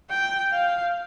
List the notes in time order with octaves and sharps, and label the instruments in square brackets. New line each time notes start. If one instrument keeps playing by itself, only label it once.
[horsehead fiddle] G5
F5